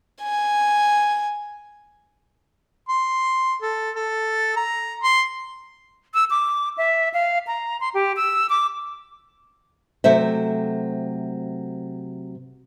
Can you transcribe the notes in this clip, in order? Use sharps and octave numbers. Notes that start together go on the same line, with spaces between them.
G#5
C6
A4
A4
A#5
C6
E6
D6
E5
F5
A#5
C6
G4
E6
D6
C3 F#3 A3 C5 E5